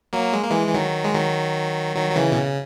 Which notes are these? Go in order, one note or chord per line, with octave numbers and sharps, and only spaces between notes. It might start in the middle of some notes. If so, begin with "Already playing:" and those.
F#3 A#3
G#3
A#3
E3 G#3
E3
D#3 F#3
G#3
D#3 F#3
D#3 F#3
F#3
C#3 E3
B2
C#3